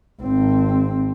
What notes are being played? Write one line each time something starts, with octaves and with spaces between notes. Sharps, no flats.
G#1 C4